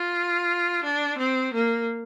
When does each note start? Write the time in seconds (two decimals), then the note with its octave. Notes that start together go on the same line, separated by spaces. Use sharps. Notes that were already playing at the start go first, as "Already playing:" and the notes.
Already playing: F4
0.84 D4
1.19 C4
1.54 A#3